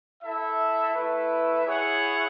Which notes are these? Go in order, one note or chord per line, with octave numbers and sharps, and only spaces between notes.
E4 A4 E5
A3 E4 B4 E5
E4 G#4 C#5 F#5